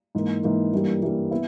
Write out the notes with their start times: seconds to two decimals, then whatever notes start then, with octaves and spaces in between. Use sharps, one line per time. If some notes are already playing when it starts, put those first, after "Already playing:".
0.15 G#2 E3 A#3
0.43 G#2 E3 A#3
0.72 G2 E3 G3 A#3
1.02 G2 E3 G3 A#3
1.31 B3 E4